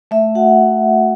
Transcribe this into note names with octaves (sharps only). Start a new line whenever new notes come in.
A3 E5
F#4 F#5